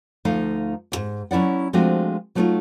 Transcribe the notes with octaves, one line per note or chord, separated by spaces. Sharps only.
D2 F3 A3 D#4 F5
D2 G#2
F#3 C#4 E4 D5 F#5
F3 G#3 A3 C4 D4 F#4
F#3 A3 B3 D4 D#4 F4